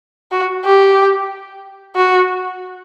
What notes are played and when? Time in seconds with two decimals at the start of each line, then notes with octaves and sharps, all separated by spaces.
0.32 F#4
0.65 G4
1.96 F#4